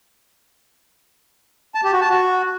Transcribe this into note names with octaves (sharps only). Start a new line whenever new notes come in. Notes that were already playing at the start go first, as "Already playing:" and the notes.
A5
G4
F#4
A5
F#4